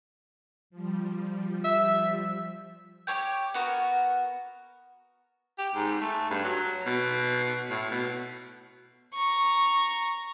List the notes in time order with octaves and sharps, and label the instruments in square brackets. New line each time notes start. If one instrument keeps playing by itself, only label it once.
[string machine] F3 G3
[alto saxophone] E5
[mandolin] G4 A#4 C#5 G5
B3 F#4 A#4
[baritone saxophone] G4
G#2
A3
G2
F#3
B2
A2
B2
[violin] A#5 C#6